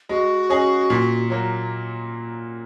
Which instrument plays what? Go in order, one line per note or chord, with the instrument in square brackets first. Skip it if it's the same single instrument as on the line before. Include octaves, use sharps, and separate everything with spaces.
[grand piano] G#3 [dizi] F#4
[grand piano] C#4 G#4 D#5
A#2
F#3 A#3